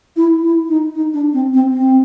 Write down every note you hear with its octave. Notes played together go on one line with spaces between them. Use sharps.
E4
E4
D#4
D#4
D4
C4
C4
C4